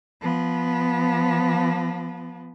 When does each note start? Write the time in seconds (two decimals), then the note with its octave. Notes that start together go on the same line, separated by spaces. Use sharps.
0.21 F3 B3